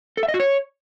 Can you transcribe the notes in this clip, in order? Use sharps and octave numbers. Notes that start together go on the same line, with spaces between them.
A4
E5
D#5
F#4
C#5